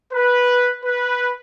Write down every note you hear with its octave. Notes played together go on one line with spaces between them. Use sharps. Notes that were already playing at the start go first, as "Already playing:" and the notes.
B4
B4